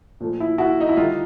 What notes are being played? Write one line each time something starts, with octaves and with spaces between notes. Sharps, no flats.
A#2 F3 A3
E4
E4 F#4
D#4
E4
D3 G3 D#4 F4